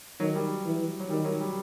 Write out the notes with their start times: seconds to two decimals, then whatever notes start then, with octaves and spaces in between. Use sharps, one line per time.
0.20 D#3 F#3
0.35 G3
0.66 E3
1.00 F#3
1.10 D#3 G3
1.25 F#3
1.41 G3